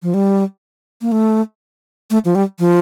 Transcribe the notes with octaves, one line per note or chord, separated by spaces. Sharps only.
F3
G3
A#3
A3
A3
F3
G3
F3